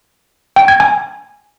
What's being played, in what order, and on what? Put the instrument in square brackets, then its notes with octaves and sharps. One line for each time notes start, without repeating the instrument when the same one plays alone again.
[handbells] G5
G#6
G#5